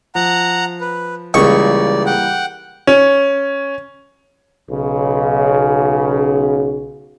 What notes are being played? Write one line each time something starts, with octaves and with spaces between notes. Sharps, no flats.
F3 F#5 A#5
B4
C#2 E3 G3 A#3 D5 C#6
F#5 G5
C#4
B1 C#3